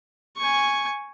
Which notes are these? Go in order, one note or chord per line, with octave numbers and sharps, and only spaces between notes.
G#5 C#6